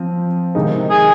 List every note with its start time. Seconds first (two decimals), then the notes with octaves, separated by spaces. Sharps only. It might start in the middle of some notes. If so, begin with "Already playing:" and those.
Already playing: F3 C4
0.55 C3 D#3 G#3 C4 D#4
0.90 G#4